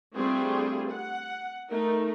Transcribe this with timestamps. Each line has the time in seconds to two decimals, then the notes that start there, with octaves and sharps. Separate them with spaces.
0.15 G3 A3 C4 D4 F4 G#4
0.91 F#5
1.69 A3 D#4 A#4